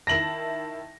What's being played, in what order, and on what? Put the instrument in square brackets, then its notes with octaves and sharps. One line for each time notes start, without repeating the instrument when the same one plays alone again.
[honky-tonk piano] D#3 E4 A5 [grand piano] A#6 F#7